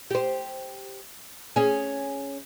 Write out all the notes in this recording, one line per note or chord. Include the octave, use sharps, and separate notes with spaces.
G4 C5
C#4 G#4